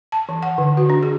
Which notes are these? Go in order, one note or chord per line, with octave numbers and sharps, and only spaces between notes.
A5
E3
F#5
D3
F#4
D4
G#4